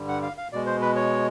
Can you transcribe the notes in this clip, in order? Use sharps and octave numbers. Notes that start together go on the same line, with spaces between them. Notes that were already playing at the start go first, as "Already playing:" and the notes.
Already playing: G2 D3 G3
F#5
F5
F5
B2 G#3 D5
C5
B4
C#5